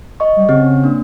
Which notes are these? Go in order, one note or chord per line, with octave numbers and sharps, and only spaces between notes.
D#5 C#6
G3
C#3 C4 G4 C#5
A#3 D4